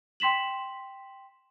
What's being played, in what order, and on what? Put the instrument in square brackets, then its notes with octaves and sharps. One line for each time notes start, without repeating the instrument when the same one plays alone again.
[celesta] G5 C6 B6 E7 F#7